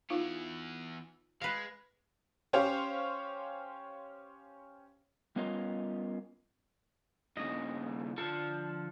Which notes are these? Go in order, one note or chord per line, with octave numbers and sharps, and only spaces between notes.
E3 B3 D#4 F4 F5
G#3 B4 F5
C#4 G4 C5 C#5 F5
G3 B3 C#4 F4 A#4 D#5
G2 C#3 D#5
D3 F3 D4 A4